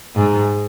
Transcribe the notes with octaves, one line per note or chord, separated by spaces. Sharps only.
G#2